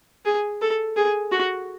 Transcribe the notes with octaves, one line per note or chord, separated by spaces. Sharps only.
G#4
A4
G#4
F#4